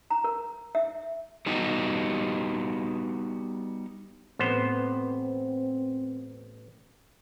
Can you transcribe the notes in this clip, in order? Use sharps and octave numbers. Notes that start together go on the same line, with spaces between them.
A#5
A#4
E5
G3 B3 D#4 F#4 G4
A1 B3 C4 C5